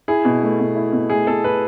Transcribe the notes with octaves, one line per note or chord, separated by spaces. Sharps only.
E4 G#4
B2
A3
B2
E4
B2
A3 G#4
B2 A4
E4 B4